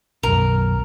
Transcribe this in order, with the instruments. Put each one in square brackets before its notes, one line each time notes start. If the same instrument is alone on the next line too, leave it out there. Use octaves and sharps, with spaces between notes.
[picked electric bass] B1 F#2 [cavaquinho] A#4